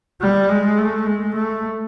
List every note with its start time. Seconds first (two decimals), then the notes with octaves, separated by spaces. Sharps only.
0.21 G3
0.49 G#3
0.78 A3
1.06 G#3
1.35 A3